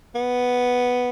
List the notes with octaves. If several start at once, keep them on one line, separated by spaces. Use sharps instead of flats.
B3